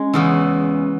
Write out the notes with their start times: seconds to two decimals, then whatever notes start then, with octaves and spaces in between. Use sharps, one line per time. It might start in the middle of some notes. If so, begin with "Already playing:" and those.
Already playing: G#3 C#4
0.13 E2 C#3 E3